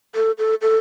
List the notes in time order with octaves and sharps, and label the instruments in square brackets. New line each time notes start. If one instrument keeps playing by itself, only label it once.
[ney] A4
A4
A4